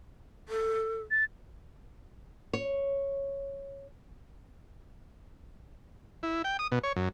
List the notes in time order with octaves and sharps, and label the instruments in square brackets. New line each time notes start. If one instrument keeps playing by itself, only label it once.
[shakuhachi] A4
[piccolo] A6
[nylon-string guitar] C#5
[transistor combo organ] E4
G5
D#6
B2
C#5
F#2